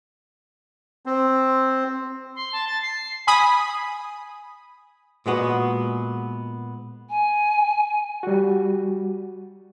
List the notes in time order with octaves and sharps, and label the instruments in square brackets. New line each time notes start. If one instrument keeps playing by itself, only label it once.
[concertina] C4
[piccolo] C6
A5
A6
C7
[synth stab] G#5 B5 D#6
[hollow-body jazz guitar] A#2 G#3 B3 F#4
[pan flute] G#5
[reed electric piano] G3 F#4